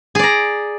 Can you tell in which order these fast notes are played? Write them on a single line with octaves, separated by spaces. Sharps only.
G#4 D5 A#5